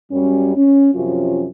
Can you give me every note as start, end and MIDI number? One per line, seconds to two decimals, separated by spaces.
0.11 0.53 42
0.11 0.53 55
0.11 0.53 61
0.56 0.90 61
0.95 1.48 42
0.95 1.48 48
0.95 1.48 53
0.95 1.48 61
0.95 1.48 65